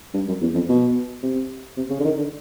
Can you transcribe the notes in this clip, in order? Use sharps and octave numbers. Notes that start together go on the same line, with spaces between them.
G2
F#2
E2
F2
B2
C3
C3
C#3
D3
D#3
D3